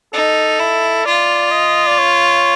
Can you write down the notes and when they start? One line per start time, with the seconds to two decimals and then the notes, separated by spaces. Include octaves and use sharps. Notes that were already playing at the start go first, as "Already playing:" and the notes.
0.13 D#4 A4
0.60 E4
1.06 F4 D5
1.51 D#5
1.87 D5
1.98 C#5